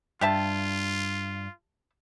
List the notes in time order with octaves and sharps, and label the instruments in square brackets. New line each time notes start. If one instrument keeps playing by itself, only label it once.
[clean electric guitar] G2 [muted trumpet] F4 [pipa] G4 E5 A5